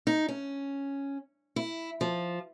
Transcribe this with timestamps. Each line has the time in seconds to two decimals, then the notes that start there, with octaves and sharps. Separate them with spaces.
0.07 D#4
0.28 C#4
1.56 E4
2.01 F3